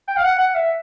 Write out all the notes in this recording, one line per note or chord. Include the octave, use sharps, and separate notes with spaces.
G5
F5
F#5
F#5
E5